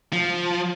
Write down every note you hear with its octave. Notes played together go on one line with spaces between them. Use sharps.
F3